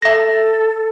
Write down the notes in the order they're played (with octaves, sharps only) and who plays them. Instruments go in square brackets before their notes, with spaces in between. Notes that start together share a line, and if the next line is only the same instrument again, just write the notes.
[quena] A4 [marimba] E5 A#6